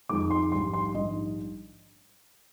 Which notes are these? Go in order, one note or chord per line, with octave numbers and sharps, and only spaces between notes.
F2 D#3 G#3 D#4 D6
C6
A#1 G#2 G3 C6
C6
A#1 G#2 D#3 G3 D4 D#5